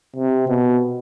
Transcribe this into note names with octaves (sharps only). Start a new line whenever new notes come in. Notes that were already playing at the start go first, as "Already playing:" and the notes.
C3
B2